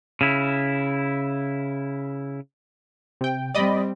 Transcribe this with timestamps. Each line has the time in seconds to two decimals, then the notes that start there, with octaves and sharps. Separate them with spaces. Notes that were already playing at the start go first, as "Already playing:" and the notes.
0.21 C#3 E4
3.21 C3 G5
3.55 G3 C4 D5 D#5 B5